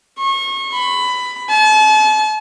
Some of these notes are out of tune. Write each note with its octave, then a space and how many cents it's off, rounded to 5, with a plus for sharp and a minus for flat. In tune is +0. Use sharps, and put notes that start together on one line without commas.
C#6 -35
B5 +15
A5 -40